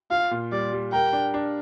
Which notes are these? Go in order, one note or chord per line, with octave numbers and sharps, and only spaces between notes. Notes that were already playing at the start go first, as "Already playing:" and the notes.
F4 F5
A#2
G3 D5
G3
A#4 G5
D4
D4